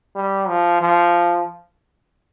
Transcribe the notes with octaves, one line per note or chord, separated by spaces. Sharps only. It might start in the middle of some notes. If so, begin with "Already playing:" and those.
G3
F3
F3